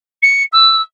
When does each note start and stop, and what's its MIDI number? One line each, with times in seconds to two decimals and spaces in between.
0.22 0.43 97
0.52 0.81 88